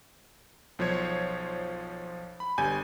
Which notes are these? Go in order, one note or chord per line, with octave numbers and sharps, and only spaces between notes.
B1 F3 C5 C#5 G#6
B5
G1 G3 G#5 G6